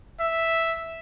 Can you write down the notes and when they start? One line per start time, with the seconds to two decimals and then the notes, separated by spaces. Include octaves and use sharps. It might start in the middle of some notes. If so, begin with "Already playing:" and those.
0.21 E5